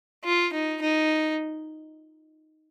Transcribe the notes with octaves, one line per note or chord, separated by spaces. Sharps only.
F4
D#4
D#4